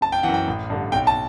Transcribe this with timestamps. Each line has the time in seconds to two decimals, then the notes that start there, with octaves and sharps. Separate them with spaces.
0.01 F#1 A5
0.12 G5
0.23 F#2 E3 F#5
0.34 G5
0.47 A1
0.70 G2 D3
0.92 B1 G5
1.07 A5